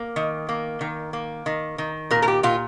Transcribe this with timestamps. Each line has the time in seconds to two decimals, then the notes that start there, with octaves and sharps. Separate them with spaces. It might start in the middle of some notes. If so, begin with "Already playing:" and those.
Already playing: A#3
0.16 D#3
0.49 A#3
0.81 D#3
1.13 A#3
1.46 D#3
1.78 D#3
2.11 A#2 A#4
2.22 A#4
2.28 G4
2.43 A#2 F4